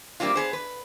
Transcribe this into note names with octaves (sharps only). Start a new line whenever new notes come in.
G3 A#3 C4 D4 F4
B3 G#4 C5
B4